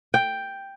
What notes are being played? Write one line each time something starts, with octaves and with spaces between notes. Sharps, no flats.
G5